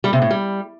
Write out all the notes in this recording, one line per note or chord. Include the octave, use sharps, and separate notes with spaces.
G3
C3
A2
G3